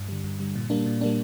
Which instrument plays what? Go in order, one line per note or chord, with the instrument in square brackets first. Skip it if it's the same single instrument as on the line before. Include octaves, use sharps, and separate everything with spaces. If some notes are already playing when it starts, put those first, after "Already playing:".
Already playing: [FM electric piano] G2
D3 G3
G2
D3 G3
A#2
G3 A#3 D4
A#2
G3 A#3 D4